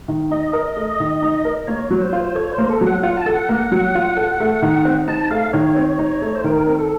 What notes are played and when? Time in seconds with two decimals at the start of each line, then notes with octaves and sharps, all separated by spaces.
0.08 D#3
0.31 D#4 D#5
0.53 A#4
0.77 A3
1.00 D#3
1.22 D#4
1.45 A#4
1.67 A#3 C#5
1.91 F#3
2.01 C5
2.13 F4
2.24 C5
2.35 A4 C#5
2.53 C5
2.58 A#3
2.70 A4
2.81 F#3
2.87 F#5
3.03 F4 F#5
3.17 A5
3.26 A4 F#5
3.49 A#3
3.72 F#3
3.95 F4
4.17 A4
4.40 A3
4.62 D#3
4.85 C4
5.07 D#4 A5
5.31 A3 F5
5.53 D#3 C#5
5.76 C4
5.99 D#4
6.22 A3
6.36 C5
6.44 D#3 A#4
6.67 C4
6.79 A4